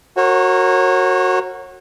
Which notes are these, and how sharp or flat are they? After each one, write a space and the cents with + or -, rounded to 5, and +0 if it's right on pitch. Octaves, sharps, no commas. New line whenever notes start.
F#4 +0 A#4 -15 C#5 -35